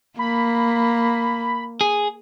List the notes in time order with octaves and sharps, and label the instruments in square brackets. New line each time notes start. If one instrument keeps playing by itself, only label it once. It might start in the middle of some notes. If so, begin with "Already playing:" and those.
[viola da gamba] A#3 [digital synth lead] B5
[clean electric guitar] G#4